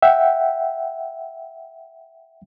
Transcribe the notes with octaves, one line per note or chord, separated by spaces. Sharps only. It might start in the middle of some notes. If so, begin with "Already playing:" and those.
E5 F#5 G5